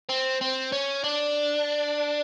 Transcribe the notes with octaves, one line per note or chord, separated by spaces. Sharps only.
C4
C4
C#4
D4